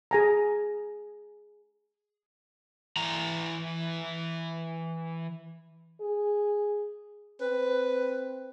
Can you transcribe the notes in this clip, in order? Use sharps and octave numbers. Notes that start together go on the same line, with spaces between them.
G#4 G#5 A#5
E3 A#5
G#4
C4 B4